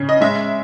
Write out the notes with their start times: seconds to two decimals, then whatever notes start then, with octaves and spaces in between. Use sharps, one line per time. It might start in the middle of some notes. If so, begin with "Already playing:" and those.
Already playing: C#3
0.09 D#5
0.21 G#3 E5